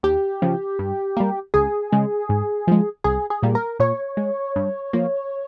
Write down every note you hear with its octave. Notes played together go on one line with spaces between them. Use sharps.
D#2 G4
C#3 F3
G2
G3 A#3
C#2 G#4
C#3 G#3
G#2
F3 G#3
C2 G#4
G#4
A#2 G3 A#3
A#4
A#2 C#5
G#3
G2
F3 A#3